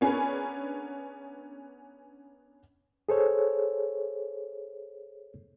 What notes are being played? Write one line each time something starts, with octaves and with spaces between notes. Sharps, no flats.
B3 C#4 D4 G#4 A#4 B4
G#4 A4 C5 C#5